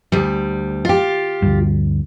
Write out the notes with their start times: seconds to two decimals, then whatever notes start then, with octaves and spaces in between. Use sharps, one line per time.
0.12 D2 G3
0.85 F4 G4
1.42 D2 G2